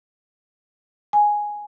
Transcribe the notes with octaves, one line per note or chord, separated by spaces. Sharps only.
G#5